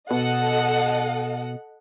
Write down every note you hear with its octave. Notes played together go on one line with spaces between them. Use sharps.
B2 A4 D#5 F#5